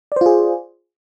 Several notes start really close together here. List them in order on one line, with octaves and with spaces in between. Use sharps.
D5 C5 F4 G#4